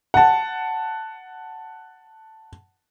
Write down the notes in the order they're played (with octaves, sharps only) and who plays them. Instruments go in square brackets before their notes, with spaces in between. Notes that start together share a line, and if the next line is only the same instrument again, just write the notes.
[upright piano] F#5 A5